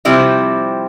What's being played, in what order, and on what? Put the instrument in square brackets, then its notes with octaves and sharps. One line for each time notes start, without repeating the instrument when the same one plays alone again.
[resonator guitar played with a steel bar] C3 F3 G3 C4 E4